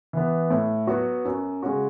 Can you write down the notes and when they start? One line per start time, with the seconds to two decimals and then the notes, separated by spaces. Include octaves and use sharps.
0.13 E3 B3
0.50 A2
0.87 F#3 B3 F#4
1.25 F#2
1.63 C#3 G#3 C#4 F#4